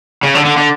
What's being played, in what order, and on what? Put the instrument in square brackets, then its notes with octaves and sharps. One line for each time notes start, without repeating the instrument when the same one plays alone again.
[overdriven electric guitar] C#3
D3
D3
D3